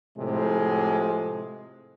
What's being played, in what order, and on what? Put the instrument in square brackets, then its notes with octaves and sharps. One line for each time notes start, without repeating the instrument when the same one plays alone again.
[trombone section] A2 C3 F3 G#3